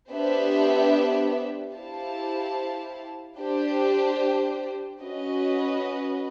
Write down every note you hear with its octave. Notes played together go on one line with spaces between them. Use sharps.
B3 D4 G4 C5 E5
E4 G4 C5 F5 A5
D4 G4 C5
C#4 F#4 B4 D#5